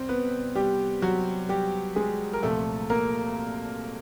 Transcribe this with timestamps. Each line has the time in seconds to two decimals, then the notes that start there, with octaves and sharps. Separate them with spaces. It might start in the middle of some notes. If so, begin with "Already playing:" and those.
Already playing: C2 C4 C5
0.09 B3 B4
0.55 G3 G4
1.02 F#3 F#4
1.49 G3 G4
1.96 G#3 G#4
2.33 A#4
2.43 C2 A#2 F3 A3 A4
2.90 A#3 A#4